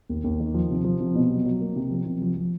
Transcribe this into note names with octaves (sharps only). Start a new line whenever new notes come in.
D#2
D#2
D#3
F3
C3
F3
C3
B2
F#3
F#3
A#3
C3
F3
C3
F3
F3